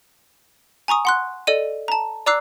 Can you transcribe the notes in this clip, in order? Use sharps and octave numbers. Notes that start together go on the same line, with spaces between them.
G#5 A#5 C#6 D#6
F#5 C6 F#6
A4 D5 D#5 D#7
A5 A#5
D5 A#5 D6 E6 F#6 C7